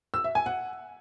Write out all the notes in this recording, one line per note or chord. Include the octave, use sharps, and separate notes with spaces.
E6
E5
G#5
F#5